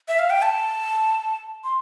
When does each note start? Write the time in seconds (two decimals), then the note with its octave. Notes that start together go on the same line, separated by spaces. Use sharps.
0.08 E5
0.19 F5
0.30 G5
0.42 A5
1.64 C6